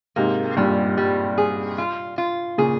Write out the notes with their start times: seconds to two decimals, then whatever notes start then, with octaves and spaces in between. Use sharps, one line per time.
0.16 G#2 C3 A#3
0.57 G2 A#2 G3
0.97 G3
1.38 G#4
1.78 F4
2.18 F4
2.58 A#2 C#3 G#4